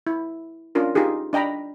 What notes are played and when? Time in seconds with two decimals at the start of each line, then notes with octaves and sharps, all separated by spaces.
0.07 E4
0.75 C#4 D4 F4 A#4
0.95 D#4 F4 G4 G#4
1.33 D4 D#5 G5 A#5 B5